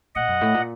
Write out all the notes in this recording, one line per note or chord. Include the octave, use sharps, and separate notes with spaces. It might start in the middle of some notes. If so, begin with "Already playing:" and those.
A#2 D#5 F#5
F#2
A2
A#2